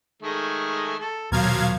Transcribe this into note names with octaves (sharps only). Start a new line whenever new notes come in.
D#3 G#3 A3
A4
D#1 B2 F3 F#3 A#4 F5 G#6